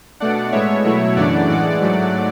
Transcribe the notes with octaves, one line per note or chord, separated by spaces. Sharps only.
B2 A3 D4 D5 F#5
A2 G#3 B3 C#5 E5
B2 F#3 A3 E4
F#2 C#3 E3 A3 D4 D5 F#5
A2 E3 G#3 D5 F#5
G#2 F#3 A3